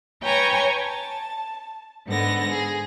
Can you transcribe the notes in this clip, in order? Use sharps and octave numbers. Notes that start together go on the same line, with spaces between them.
B4 C#5 G5 G#5 A#5 C#6
A5
G#2 D3 B3 A#6
G#4